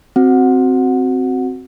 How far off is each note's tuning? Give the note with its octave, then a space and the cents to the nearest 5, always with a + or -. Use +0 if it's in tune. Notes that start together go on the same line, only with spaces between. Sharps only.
C4 +0 F#4 +0 F#5 -15